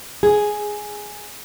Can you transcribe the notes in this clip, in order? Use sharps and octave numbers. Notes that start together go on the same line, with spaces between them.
G#4